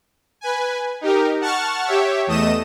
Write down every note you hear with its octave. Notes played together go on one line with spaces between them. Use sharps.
B4 G#5
D#4 G4 A#4
F#5 A5 C#6 F6 A6
G4 C#5 E5
E2 A3 D#5 D#6 E7